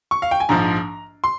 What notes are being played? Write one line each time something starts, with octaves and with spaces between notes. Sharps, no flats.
C#6
F5
G5
G#5
A#1 G#2 F3 A#5
C6